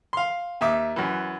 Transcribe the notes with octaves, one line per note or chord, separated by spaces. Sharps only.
F5 C6
D#2 E5 D6
F#2 E3